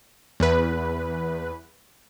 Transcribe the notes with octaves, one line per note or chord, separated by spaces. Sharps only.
E2 B4